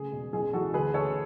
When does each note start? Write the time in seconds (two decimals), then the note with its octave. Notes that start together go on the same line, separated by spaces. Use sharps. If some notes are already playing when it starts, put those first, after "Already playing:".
Already playing: C#3 A3 G#4
0.13 E1
0.33 A1 G#4
0.53 E3 F#4 A4
0.74 D2 G#4 B4
0.94 D2 A4 C#5